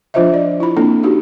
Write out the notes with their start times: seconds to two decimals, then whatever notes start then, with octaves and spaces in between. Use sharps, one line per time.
0.14 F3 D4 F4 C5 D#5 E5
0.34 D5
0.60 E4 F4 B5
0.77 A#3 C4 D4 E4 A4
1.03 D#4 F#4 G4